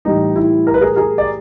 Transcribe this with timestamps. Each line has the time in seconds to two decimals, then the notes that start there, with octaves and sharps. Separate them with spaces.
0.05 A2 E3 G3 D#4
0.36 E4
0.67 A#4
0.74 B4
0.81 G#4 A#4
0.96 G#4 A#4
1.18 D5